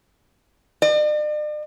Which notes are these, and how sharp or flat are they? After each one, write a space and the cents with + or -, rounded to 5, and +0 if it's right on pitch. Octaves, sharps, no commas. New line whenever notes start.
D5 +45